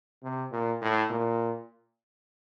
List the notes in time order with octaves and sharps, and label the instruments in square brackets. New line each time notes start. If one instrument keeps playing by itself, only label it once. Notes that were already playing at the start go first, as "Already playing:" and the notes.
[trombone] C3
A#2
A2
A#2